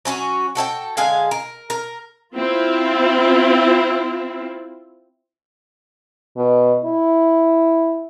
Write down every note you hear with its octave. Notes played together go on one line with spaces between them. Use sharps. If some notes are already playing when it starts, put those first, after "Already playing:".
F#3 C#4 E4 F#4
F#4 A4 C#5 G5
D3 G#3 F5 G#5
A#4
A#4
C4 E4 F4
B2
E4